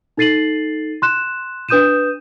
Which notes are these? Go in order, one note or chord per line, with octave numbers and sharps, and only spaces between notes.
D#4 A4 A6 C7 D#7 F#7
C6 F#6 E7
D4 B4 D#6 G6 D#7 E7